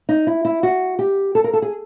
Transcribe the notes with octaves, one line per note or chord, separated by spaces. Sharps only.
D#4
E4
E4
F#4
G4
A4
A#4
A4
G#4